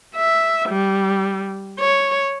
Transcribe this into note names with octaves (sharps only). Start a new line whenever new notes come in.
E5
G3
C#5